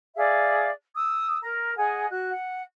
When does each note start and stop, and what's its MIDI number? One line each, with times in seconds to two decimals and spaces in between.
0.16 0.69 68
0.16 0.69 74
0.16 0.69 76
0.16 0.69 77
0.95 1.36 87
0.95 1.36 88
1.42 1.76 70
1.42 1.76 82
1.77 2.05 68
1.77 2.05 75
1.77 2.05 78
1.77 2.05 80
2.09 2.31 66
2.09 2.31 90
2.31 2.63 78